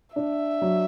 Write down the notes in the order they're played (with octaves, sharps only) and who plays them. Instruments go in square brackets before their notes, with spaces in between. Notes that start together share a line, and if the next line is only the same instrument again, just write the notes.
[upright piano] D4 [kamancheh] E5
[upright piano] F#3